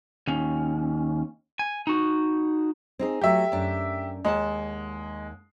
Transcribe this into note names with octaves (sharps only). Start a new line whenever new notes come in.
D#2 C#4
G#5
D#4 F#4
C4 D#4 G#4
F#3 A3 G4 E5
F#2 D4
D#2 G#3 F#5 A5